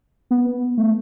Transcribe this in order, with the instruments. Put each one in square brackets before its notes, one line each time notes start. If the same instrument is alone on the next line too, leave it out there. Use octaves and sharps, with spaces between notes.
[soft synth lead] B3
A3